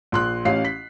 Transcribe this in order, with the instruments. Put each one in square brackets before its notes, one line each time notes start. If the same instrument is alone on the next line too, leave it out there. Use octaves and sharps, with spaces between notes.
[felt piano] A#1 C6 F#6
A1 C#4 F5 C7
B6